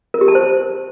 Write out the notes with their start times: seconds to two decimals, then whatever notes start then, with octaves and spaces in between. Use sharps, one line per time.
0.14 A#4
0.21 G4
0.28 A5
0.35 C5